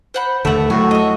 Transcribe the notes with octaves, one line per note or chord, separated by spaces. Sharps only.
C5 F#5 B5
D#2 D3 A3 B4 F#5
A2 F#3 G#3 A3 F#4 G#5
D#5 E5